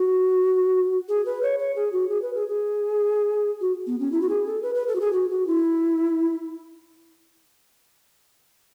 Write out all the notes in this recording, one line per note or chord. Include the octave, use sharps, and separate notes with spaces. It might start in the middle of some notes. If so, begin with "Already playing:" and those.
Already playing: F#4
G#4
B4
C#5
C#5
G#4
F#4
G#4
B4
G#4
G#4
F#4
B3
C#4
E4
F#4
G#4
A4
B4
B4
A4
F#4
G#4
F#4
F#4
E4